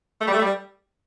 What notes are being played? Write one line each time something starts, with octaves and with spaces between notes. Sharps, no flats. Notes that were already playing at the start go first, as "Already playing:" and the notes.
A3
G3
A3
G3